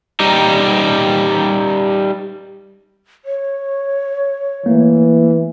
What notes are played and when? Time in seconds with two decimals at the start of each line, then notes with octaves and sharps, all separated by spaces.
0.20 G3 D#4 G4
3.25 C#5
4.66 E3 A3 A#3